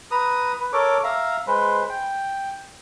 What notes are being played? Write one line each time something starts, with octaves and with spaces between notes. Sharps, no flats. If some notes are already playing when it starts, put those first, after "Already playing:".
B4 A#5 D#6
B4
A4 A#4 C#5 D6
E5 F5 A#5
G#3 B4 C5
G5